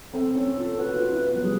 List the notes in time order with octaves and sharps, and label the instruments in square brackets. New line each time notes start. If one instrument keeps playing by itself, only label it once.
[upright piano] C4 [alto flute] A4
[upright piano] C#4
F4
[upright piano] F#4 [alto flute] B4
[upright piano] F4
E4
B3
F#3
[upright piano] G3 [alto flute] G#4